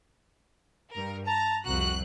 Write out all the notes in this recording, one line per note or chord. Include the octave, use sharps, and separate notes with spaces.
G2 A#4
A5 A#5
C2 F2 F#4 F#6